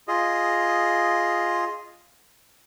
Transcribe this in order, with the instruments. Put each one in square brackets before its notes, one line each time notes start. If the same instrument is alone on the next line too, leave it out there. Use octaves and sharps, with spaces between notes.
[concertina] F4 G#4 D#5